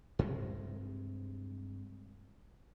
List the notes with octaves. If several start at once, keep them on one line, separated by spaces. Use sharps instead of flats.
G2 C3 G#3